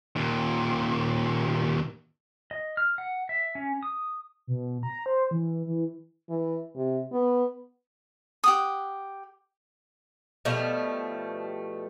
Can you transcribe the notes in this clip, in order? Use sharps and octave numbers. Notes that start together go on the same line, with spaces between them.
D#2 A#2
D#5
F6
F#5
E5
C#4
D#6
B2
A#5
C5
E3
E3
E3
C3
B3
G4 F#5 D#6
B2 F3 G3 A3